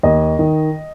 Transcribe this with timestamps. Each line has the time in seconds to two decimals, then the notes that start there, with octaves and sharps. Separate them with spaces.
0.03 D#2 D#5
0.39 D#3